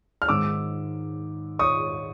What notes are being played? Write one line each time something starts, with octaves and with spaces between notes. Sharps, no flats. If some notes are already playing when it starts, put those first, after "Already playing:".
F6
G#2 D#3 G#3 D6 E6
C#6 D#6